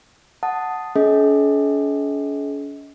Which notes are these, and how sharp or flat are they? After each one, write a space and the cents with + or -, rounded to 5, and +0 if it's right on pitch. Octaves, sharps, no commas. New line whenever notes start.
F#5 +0 A5 +0 D#6 +0
C#4 +40 G#4 +45 D#5 +35